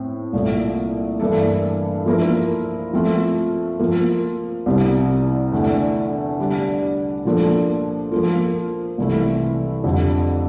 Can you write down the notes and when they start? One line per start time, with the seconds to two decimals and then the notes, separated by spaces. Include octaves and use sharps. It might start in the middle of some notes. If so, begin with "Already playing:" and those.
Already playing: A2 C4
0.33 C2 A#2 A3
1.20 G2 E3 A#3 D4 A4
2.06 F3 A#3 E4 A#4
2.93 F3 A3 C4 F4
3.80 F3 A#3 F4
4.66 C2 C3 G3
5.52 E2 D3 A3 D4
6.39 D3 G3 D4
7.25 A#2 F3 A#3 D4 A4
8.12 F3 A#3 F4
8.98 C2 C3 E3 A3 E4
9.84 F2 D3 G3